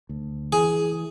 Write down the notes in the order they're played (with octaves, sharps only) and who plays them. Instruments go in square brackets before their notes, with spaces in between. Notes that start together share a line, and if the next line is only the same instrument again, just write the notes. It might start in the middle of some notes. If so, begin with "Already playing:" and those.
[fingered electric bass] D2
[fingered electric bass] E3 [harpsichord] G#4